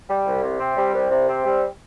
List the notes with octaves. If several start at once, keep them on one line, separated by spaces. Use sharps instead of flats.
G3
C2
C3
C4
G3
C2
C3
C4
G3